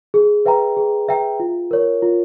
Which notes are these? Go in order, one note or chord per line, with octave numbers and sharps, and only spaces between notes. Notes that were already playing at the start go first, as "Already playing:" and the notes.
G#4
B4 E5 G5 A#5
G#4
B4 E5 G5 A#5
F4
A#4 C#5
F4